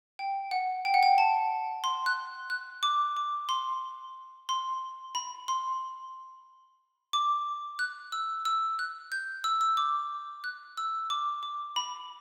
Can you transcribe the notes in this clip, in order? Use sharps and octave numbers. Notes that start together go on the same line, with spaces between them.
G5
F#5
G5
F#5
G5
A5
C6
F#6
F#6
D6
D6
C6
C6
B5
C6
D6
F#6
E6
E6
F#6
G6
E6
E6
D6
F#6
E6
D6
D6
B5